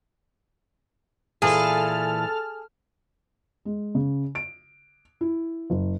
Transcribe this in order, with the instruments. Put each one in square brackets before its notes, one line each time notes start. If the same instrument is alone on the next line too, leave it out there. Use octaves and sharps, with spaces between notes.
[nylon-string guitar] A#2 E3 [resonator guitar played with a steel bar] G#4 [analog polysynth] A4 A5 F6
[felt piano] G#3
C#3
D7
E4
F#1